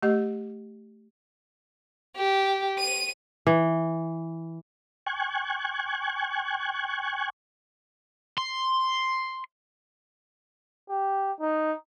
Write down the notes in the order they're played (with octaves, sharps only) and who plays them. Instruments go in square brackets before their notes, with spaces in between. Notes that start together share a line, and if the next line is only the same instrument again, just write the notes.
[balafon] A3 G4 D#5
[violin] G4
D#7
[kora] E3
[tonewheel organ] G5 G#5 C#6 F#6 G#6
[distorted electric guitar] C6
[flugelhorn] G4
D#4